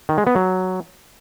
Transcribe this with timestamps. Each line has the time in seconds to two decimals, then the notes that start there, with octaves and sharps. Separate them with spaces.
0.09 D#3
0.18 G#3
0.27 B3
0.35 F#3